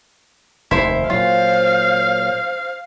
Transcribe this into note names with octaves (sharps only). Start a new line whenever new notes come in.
F1 D#2 E4 C5
A#2 F#3 F4 C5 F5